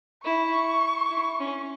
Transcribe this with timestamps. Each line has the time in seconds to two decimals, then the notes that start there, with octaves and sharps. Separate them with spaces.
0.24 E4 C#6
1.10 E4
1.40 C#4